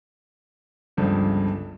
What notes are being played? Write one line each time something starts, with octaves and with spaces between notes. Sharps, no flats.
G1 C#2 G2 F3